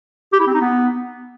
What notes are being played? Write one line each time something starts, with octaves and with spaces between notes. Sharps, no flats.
G4
E4
C4
D#4
B3